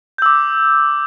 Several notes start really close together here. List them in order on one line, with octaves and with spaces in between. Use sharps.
G6 E6 D6